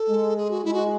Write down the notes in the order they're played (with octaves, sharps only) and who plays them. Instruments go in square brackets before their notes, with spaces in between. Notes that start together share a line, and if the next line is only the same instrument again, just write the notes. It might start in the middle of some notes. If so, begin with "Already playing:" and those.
Already playing: [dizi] A4
[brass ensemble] G#3
[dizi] G#4
F#4
[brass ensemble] G#3 [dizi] E4
[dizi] F#4